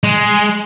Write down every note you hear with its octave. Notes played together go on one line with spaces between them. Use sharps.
G#3